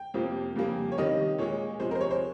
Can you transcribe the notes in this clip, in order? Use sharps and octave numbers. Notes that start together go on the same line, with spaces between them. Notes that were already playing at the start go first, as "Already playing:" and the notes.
Already playing: G5
F2 C3 F3 A#3
F2 C#3 G3 A#3
C#5
C3 D#3 G3 D#5
A#2 G#3 C#5
C3 F3 G#3 C5
A#4 C5
C#5
C5